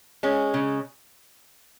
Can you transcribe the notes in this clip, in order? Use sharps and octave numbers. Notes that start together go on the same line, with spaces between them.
G#3 C#4
C#3